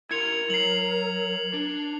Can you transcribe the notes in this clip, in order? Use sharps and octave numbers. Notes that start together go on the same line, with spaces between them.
E4 A#4 C6 G#6 C#7 F7
F#3 C7 F#7
D4